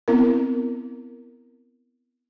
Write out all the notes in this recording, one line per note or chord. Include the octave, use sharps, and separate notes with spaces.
B3 C4 E4 A#4